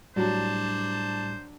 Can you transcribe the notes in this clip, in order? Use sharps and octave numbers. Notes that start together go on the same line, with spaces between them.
A2 F#3 G3 D4 F#4 C5 A5